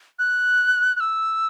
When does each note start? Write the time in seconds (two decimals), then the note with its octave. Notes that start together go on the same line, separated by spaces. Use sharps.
0.19 F#6
0.96 F#6
1.00 E6